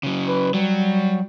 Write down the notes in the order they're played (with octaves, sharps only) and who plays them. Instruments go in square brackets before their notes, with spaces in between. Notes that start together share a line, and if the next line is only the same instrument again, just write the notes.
[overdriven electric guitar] C#3 F#3
[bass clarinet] B4
[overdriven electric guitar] F#3 [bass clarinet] G3